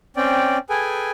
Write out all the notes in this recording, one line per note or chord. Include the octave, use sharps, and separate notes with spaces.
C4 C#4 D5 G5
G#4 A4 B4 G5 G#5